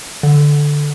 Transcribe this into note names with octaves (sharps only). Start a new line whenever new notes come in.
D3